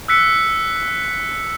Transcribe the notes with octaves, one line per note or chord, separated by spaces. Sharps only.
E6 F#6 B6 C#7